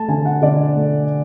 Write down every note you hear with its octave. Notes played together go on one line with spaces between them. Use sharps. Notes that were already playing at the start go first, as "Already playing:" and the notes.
Already playing: A3 A5
D3 G#5
F#5
D3 D5
A3